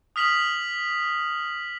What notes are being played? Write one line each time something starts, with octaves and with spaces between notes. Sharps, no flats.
D#6 F6 B6 F7 F#7